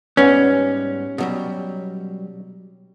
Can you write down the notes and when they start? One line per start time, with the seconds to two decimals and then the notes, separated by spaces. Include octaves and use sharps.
0.17 G#2 G3 B3 C#4
1.18 B2 F#3 G3